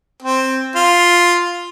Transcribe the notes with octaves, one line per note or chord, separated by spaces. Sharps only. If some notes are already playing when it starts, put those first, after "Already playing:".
C4
F4